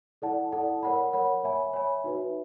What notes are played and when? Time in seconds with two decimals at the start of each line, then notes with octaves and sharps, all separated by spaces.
0.22 E4 A4 D5 F#5 A5
0.52 E4 A4 D5 F#5 A5
0.83 A#4 C#5 F#5 B5
1.13 A#4 C#5 F#5 B5
1.43 C#5 E5 G#5 B5
1.73 C#5 E5 G#5 B5
2.04 D#4 F#4 B4 E5